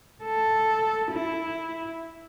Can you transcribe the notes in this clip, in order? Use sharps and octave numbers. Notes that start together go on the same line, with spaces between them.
A4
E4